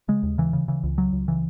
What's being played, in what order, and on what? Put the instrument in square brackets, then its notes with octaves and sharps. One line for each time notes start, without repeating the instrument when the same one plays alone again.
[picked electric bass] C#3 G#3
D#2
C#3 E3
C#3
C#3 E3
C#2
C#3 F#3
C#2
C#3 E3